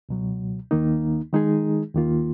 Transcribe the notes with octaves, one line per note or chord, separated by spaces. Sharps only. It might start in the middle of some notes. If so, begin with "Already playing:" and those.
C#2 B2 F#3
D#2 D#3 A#3 D#4
D#3 G#3 D#4 G#4
D#2 D#3 A#3 F4